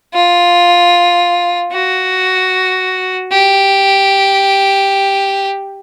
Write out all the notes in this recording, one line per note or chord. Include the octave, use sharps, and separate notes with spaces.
F4
F#4
G4